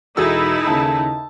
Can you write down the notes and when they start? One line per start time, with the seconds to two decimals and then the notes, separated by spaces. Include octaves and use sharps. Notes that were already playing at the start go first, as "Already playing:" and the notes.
0.17 E1 D#4 E4 F#4 G#4 A4 E6
0.67 D#2 C#3 A5